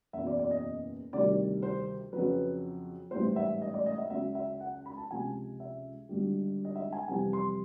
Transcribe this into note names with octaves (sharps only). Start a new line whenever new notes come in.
F#1 E2 B2 E5
D5
D5
D#5
D2 C3 D#3 G3 D5
C5
F2 C#3 F#3 B4
A1 G#2 E3 G3 C5
E5
D#5
D5
D#5
E5
C#2 C#3 F#3 E5
E5
F#5
B5
A5
C#2 C3 F3 G#5
E5
G#1 G2 D3 G3
D#5
E5
G#5
F2 C3 E3 G3 G#5
C6